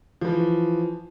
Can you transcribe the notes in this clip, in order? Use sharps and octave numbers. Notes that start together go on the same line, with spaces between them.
E3 F3